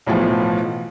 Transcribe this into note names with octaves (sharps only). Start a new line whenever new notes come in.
B1 A2 E3 F3